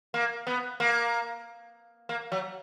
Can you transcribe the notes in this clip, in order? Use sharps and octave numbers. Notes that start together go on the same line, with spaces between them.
A#3
B3
A#3
A#3
F#3